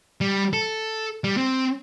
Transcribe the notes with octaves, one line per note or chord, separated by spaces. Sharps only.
G3
A4
G3
C4